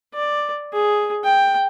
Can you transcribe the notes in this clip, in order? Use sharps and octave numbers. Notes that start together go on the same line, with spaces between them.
D5
G#4
G5